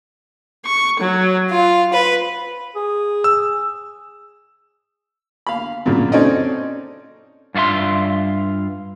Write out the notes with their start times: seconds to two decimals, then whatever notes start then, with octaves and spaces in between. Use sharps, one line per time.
0.64 C#6
1.00 F#3
1.52 F4
1.93 B4
2.76 G#4
3.24 E6
5.47 F5 B5
5.86 F#2 A#2 C#3
6.12 C4 C#4 D#4 A4 D5 D#5
7.55 G2 F4 F#4 E5 C6